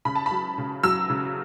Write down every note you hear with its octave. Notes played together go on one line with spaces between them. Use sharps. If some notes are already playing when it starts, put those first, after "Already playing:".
C#3 B5
A5
B5
F#3
C#3
F#3 E6
C#3